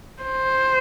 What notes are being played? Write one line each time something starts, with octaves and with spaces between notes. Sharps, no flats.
C5